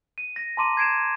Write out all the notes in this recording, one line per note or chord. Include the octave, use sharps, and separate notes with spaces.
D#7
A#6
A5 A#5 C6 D6 D#7
G#6 C7 D7 E7